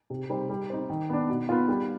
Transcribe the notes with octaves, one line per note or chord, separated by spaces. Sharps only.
C3
G3 C4 D#4
G3
C4 D#4
D#3
B3 D4
B2
B3 F4
G3